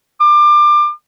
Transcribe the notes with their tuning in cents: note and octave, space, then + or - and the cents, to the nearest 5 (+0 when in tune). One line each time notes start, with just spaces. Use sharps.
D6 +25